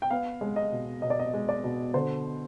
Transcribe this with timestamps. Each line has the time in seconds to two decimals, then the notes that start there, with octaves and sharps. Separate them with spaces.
0.02 G5
0.10 B3 F5
0.41 G#3
0.56 D#5
0.72 B2
1.02 B2 D#5
1.10 D5
1.19 D#5
1.34 G#3
1.49 D5
1.64 B2
1.94 D3 C5